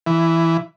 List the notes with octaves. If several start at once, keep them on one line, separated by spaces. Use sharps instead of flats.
E3